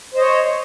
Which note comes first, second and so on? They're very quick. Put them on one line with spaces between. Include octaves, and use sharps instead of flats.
C5 D#5 C#5